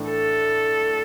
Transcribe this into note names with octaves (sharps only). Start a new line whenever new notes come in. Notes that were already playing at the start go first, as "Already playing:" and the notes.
Already playing: A2 E3 A3 D4
A4